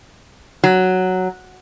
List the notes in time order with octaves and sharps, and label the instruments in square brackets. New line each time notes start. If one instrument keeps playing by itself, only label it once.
[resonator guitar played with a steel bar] F#3